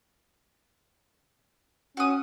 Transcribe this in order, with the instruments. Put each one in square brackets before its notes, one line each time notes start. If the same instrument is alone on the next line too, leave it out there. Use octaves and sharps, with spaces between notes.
[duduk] C#4 [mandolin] F#4 D#6